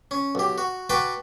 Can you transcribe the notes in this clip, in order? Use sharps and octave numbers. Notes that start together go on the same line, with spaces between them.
C#4
B1 G4
F#4
F#4 B4 G5 A5 D6